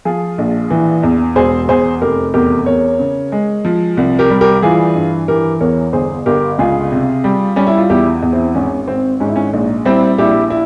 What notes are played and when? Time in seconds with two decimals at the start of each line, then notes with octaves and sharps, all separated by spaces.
0.05 F3 F4 G#4
0.38 A#1
0.70 E3
1.03 E2
1.36 E1 G#4 C5
1.68 E2 G#4 C5
2.02 F1 G4 A#4
2.34 E2 G4 A#4
2.66 E2 A#4 C#5
2.99 C#3
3.32 G#3
3.65 F3
3.97 C2
4.19 G4 A#4
4.30 G3
4.41 G4 A#4
4.62 E3 F4 G#4
4.95 G2
5.28 E3 G4 A#4
5.60 E2 A#4 C#5
5.93 G1 G#4 C5
6.26 G1 G4 A#4
6.59 C#2 F4 G#4
6.92 C3
7.24 G3
7.56 G3 C#4
7.67 E4
7.78 F4
7.90 E2 E4 G4
8.22 E2
8.33 C4 E4
8.55 G#1 C#4
8.87 G#1 C4
9.20 G#2 C#4
9.28 E4
9.36 C#4
9.53 A#1
9.85 G3 C4 E4
10.18 A#1 E4 G4
10.50 E4